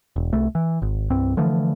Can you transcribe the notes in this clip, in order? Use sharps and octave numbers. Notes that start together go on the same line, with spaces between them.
E1
C2 A3
E3
G#1
C2 G2 C4
D3 E3 F3 A3